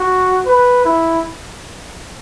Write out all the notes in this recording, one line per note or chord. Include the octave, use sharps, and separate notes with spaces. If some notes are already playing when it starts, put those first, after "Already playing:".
Already playing: F#4
B4
E4